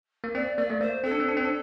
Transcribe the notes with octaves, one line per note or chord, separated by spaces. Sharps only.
A#3
C4 D5
A#3 D5
A3
A#3 C5
C4 A4
D4
C4
D4
C4
D4